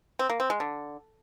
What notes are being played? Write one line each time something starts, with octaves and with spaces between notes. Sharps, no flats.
C4
A#3
C4
G#3
D3